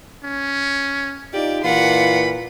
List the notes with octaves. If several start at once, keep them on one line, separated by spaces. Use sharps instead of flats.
C#4
D#4 F4 G4 D5
A#2 E3 F4 F#5 B5